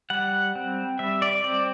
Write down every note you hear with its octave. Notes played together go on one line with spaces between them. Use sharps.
G3 F#5
C4
G3 E5
D5
C4 D5